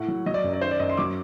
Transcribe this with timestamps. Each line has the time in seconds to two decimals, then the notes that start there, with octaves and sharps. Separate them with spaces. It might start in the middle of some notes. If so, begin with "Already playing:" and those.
Already playing: A2 F#5
0.08 F#3
0.26 F#3 D#5
0.34 D5
0.44 F#2
0.53 D5
0.61 D#3 C5
0.71 D5
0.80 F#2 D#5
0.90 C6
0.97 F#3 D6